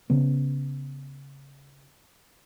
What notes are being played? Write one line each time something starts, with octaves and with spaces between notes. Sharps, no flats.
C#3 B3